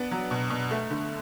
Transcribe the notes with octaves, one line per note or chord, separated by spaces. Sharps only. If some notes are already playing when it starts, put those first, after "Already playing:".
Already playing: B3 D4
F#3
B2
B2
A3
D3